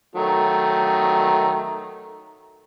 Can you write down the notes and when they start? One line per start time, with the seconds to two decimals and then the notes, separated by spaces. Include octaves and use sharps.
0.15 D#3 F#3 A3